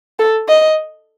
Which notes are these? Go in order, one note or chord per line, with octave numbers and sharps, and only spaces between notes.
A4
D#5